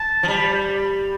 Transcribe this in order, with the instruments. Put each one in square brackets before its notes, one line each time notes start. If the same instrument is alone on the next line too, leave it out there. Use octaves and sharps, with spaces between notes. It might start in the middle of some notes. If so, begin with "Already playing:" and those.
Already playing: [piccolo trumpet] A5
[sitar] F3
[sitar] G3 [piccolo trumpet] B5